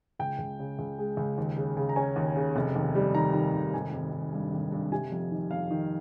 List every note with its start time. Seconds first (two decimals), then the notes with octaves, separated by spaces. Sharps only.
0.19 C#2 G5
0.39 C#2
0.59 C#3
0.79 C#2
0.98 G#3
1.17 C#2
1.38 D#2
1.57 C#3
1.77 C#3
1.89 A#5
1.96 C#4 G#5
2.16 D#2
2.36 C#3
2.56 F1
2.75 D#2
2.95 G3
3.14 D#3 A#5
3.34 D#3
3.53 F1
3.74 G#1 G#5
3.94 G#1
4.12 G#1
4.33 G2
4.52 G#1
4.72 G2
4.92 C3 G#5
5.12 F2
5.31 D#3
5.51 F2 F5
5.71 D#3